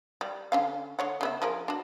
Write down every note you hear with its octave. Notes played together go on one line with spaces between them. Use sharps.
G3
D3 C#4 F5
D3 C#5 F#5
C#3 B3 E5
F3 G#4 A#4
D4 F#4